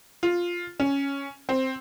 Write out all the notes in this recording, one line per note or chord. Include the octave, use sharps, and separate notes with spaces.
F4
C#4
C4